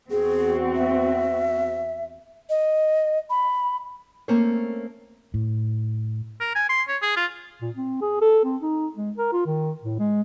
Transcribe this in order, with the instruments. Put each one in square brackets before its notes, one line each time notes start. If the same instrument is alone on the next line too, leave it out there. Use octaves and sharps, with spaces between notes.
[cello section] E2 C4 F#4 [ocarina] G#4
[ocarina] E5
D#5
B5
[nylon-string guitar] A3 A#3 C4 C#4 C5 C#5
[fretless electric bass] A2
[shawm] A#4
G#5
C6
C#5
G#4
F4
[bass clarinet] A#2
C4
G#4
A4
C4
D#4
G#3
A#4
F4
D#3
A2
G#3